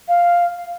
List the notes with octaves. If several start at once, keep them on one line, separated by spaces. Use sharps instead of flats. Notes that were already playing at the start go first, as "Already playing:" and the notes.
F5